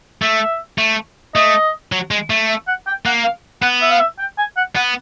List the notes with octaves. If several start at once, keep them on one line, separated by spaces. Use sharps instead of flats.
A3 E5
A3
A3 D#5
F#3
G#3
A3
E5
F#5
G5
A#3 F#5
F5
B3 F#5
E5
F5
E5
G5
G#5
F#5
B3 F#5